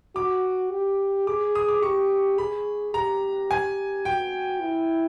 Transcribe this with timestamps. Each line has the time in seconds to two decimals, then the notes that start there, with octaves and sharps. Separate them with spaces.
0.15 F#4 D6
0.71 G4
1.27 G#4 D6
1.55 D#6
1.68 D6
1.82 G4 C#6
2.38 G#4 B5
2.94 G4 A#5
3.51 G#5
4.05 F#4 G5
4.61 E4